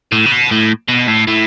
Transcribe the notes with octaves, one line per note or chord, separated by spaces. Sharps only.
A2
C#3
B2
A2
B2
A2
A2